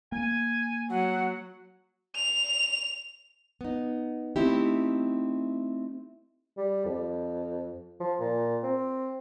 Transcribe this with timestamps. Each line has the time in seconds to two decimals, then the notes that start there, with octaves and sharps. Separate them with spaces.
0.12 A#3 G#5
0.90 F#3 F#5
2.15 F7
3.61 B3 D#4
4.36 A3 C4 D#4 E4 G4
6.57 G3
6.85 F2
8.00 F3
8.20 A#2
8.63 C4